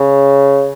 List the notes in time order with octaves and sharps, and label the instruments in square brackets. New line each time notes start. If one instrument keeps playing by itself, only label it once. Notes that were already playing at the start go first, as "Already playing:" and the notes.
Already playing: [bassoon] C#3